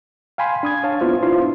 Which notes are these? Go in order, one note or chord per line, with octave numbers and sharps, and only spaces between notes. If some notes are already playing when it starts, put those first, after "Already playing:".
F5 G5 G#5 B5 C6
D4 D#6 G#6
C#5 F5 A5
B3 D4 E4 F4 C5 F5
D4 E4 F4 C5 C6